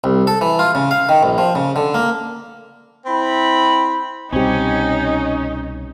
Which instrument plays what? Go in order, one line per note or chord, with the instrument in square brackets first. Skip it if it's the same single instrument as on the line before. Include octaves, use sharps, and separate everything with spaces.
[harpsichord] C2
A4
E3
F4
C#3
F5
D#3
A#1
F3
C#3
D3
A#3
[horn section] C4 E4 B5
[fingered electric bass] C2 B2 G3 [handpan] C4 G4 [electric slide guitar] C#4 [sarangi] D#4